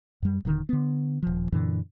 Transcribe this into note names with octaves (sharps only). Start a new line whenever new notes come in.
F#2 G3
D#1 D3 D#3
D3 B3
D#1 F3
F#2 A#2 D3 E3